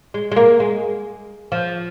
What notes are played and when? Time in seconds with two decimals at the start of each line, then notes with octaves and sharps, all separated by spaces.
0.14 G#3
0.32 G#3
0.36 A#3
0.60 G#3
1.52 F3